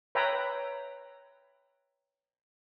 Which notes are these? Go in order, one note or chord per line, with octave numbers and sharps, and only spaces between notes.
B4 C#5 E5 G5 A#5